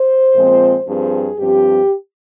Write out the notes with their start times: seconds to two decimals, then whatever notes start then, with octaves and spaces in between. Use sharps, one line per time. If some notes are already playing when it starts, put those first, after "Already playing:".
Already playing: C5
0.34 A#2 F3 G#3 C4
0.87 G2 F3 C4 G#4
1.39 G2 F3 C4 G4